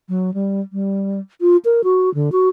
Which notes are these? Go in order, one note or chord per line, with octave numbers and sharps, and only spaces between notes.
F#3
G3
G3
F4
A#4
F#4
D3
F#4